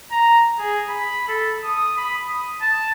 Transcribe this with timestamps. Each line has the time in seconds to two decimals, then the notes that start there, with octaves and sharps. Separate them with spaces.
0.11 A#5
0.59 G#4
0.89 B5
1.28 A4
1.63 D#6
1.97 B5
2.29 D#6
2.61 A5